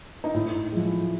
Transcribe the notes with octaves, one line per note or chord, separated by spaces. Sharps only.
D#4
A2 E4
F3 G#3